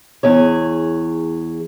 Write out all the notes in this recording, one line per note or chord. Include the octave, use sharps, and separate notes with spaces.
E2 G#4 C#5